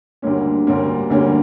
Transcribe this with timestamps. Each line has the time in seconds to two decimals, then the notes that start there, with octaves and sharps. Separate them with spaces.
0.22 D2 D3 G3 A#3 C#4
0.67 D2 D3 G3 A#3 C#4
1.10 D2 D3 G3 A#3 C#4